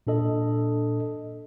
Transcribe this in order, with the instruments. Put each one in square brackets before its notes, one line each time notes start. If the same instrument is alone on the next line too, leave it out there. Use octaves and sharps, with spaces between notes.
[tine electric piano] A#2 D4 A4 D#5